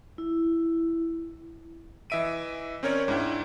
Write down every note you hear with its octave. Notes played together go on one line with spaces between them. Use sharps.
E4
E3 D#5 E5 D7 D#7
C4 C#4 A#4 C#5 D5
G#2 D4 E4 G5